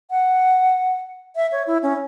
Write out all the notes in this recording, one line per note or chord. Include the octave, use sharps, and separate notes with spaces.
F#5
E5
C#5
E4
C#4